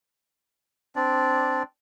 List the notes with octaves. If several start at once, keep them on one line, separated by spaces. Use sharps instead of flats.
C4 D4 D5